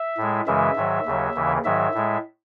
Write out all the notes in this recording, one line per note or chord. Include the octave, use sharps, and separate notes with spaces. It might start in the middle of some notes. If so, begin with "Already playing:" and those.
Already playing: E5
A2 G#3
F#2 C#3 E3 G#3 E5
G#2 D#3 F#3
D#2 C#3 F#3
D#2 C#3 E3
G#2 D#3 F#3 E5
A2 G#3